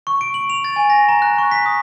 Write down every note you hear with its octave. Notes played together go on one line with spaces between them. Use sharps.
C#6
D7
F#7
F7
A6
G#5
A#6
A#5
F#6
C#6
B6
D#6